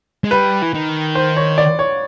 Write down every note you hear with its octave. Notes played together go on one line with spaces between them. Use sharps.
G#3
G3 B4
E3
D#3
C5
C#5
D5
C#5